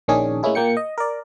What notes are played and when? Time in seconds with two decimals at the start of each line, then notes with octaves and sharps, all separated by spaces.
0.08 A#1 D#3 C#4 D4 G#4
0.43 A2 G#3 A#3 C#4 E4 G#4
0.55 A#2 A#3 G5 C#7
0.77 D#5
0.98 A#4 D5